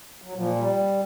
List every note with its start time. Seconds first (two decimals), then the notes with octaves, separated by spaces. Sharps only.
0.22 F#3
0.34 A#2 F3
0.55 G3